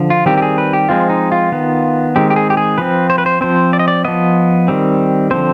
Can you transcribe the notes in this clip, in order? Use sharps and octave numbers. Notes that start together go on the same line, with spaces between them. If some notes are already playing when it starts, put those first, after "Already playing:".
Already playing: D3 F3
F4
D#3 G3 C4 G4
G4
G#4
B4
G4
F3 G#3 C4 F4
D#4
F4
D#3 B3
D#3 G#3 C4 G4
G4
G#4
G4
G#4
F3 C4 B4
C5
B4
C5
F3 C4 C5
D5
D#5
D5
F3 B3 D#5
D#3 G3 C4
D3 F3 C4 C5